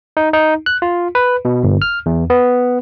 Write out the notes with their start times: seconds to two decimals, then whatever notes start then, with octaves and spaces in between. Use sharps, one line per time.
0.17 D#4
0.33 D#4
0.66 F#6
0.82 F4
1.15 B4
1.45 B2
1.64 G1
1.82 F6
2.06 E2
2.30 B3